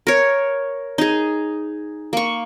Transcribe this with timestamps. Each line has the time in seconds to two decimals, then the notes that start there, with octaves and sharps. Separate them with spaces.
0.07 A#4 C#5
0.98 D#4 G#4
2.13 A#3 C#6